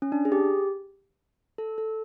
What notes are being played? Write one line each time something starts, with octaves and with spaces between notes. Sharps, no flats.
C#4
D4
G#4
G4
A4
A4